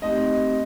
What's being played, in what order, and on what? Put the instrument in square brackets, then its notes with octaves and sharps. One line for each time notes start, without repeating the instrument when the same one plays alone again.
[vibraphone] A3 C4 D#4 G4 [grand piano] D#5